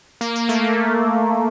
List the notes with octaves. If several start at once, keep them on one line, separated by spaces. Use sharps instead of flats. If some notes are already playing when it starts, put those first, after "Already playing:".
A#3
A#3
A3